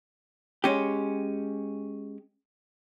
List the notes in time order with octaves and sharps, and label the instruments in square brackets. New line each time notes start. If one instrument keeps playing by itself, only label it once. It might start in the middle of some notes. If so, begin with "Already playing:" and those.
[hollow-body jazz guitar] G#3 C#4 G4